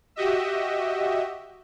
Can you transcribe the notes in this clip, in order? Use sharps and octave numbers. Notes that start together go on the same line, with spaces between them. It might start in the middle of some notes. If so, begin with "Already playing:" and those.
F#4 G4 D#5 E5